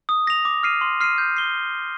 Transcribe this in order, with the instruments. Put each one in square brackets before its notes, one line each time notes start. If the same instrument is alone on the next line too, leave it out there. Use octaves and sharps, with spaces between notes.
[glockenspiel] D#6
A#6 F7
D6
F6 C7 D#7
C6
F6 C7 D#7
G6
C7 G7